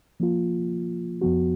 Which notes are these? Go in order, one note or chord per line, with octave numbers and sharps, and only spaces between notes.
F3 A#3 F4
F2 F3 B3 F#4